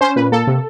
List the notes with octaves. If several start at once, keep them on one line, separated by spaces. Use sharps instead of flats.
C#4 C5
A#2 B4
A#3 A4
C3